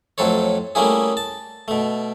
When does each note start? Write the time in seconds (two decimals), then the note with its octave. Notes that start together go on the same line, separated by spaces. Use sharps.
0.18 F2 A2 F#3 A4 C5 C#5
0.75 G3 A3 A#3 C#4 E4 G#4
1.17 A5
1.68 B2 A3